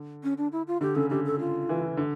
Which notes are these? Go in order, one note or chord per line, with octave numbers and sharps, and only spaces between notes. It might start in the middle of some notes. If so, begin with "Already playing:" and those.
Already playing: D3
C#4
D4
E4
F4
D3 G4
C#3 A4
D3 G4
A4
F4
E3
D3